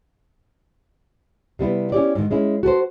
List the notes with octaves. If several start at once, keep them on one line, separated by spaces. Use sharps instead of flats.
C3 G3 B3 E4
C#4 E4 F4 G4 C#5 D5
G#2 D#3
G#3 C#4 E4
F#4 A4 B4 C5